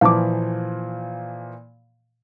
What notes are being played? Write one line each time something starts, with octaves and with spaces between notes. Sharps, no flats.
A#2 E3 F3 F5 A5 D6